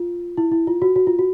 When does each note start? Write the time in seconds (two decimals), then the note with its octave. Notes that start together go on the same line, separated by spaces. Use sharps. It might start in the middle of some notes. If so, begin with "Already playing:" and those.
Already playing: F4
0.37 E4
0.52 E4
0.67 F4
0.82 F#4
0.96 F#4
1.07 F4
1.19 F#4